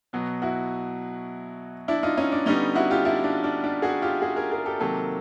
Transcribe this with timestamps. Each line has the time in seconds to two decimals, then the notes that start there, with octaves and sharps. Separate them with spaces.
0.13 B2 F#3 B3
0.42 E4 F#4
1.88 D4 E4
2.03 D#4 F4
2.17 C#4 D#4
2.32 D4
2.46 D3 G3 B3 C#4 D#4
2.75 E4 F#4
2.91 F4 G4
3.05 D4 E4
3.24 D4
3.44 D4
3.64 D4
3.82 F#4 G#4
4.02 F4 G4
4.22 F#4 G#4
4.36 G#4 A#4
4.51 G#4 A#4
4.66 G4 A4
4.80 C3 D#3 F#3 A#3 G4 A4